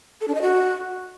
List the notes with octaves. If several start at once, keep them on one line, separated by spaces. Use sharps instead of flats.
A4
D4
D#5
F#4